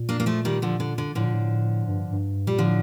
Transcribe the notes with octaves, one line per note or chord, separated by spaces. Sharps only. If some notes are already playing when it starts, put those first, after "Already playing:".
Already playing: A#2
A#3 D4
A#3
F3 A3
D#3 G3
D3 F3
D3
D3
A2 D3 F3
A#2
A2
G2
G2
A#2 G3
A2 D3 F3